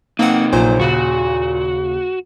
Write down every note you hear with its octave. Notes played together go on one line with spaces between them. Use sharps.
C3 A#3 C4 D#4 F#5
A#1 A#2 F#3 C5
D#2 C#3 F#4